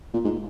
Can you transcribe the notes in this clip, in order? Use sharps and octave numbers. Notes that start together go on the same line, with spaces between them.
A#2
G#2